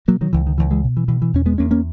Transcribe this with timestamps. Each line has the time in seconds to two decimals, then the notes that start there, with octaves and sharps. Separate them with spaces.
0.08 B2 F#3 A#3
0.21 D#3 F#3
0.33 C#2 E3
0.47 D#3
0.58 C#2 E3
0.71 E3 G#3
0.84 B2
0.97 E3
1.08 B2 E3
1.22 E3
1.33 E2 C#4
1.46 G#3 B3
1.58 E2 A#3 C#4
1.71 A#3 C#4